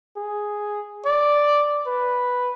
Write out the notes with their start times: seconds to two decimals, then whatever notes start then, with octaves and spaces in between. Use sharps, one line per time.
0.17 G#4
1.05 D5
1.87 B4